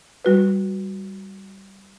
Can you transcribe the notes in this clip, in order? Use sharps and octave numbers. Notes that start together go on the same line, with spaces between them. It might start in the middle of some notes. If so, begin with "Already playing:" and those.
G3 F#4 B4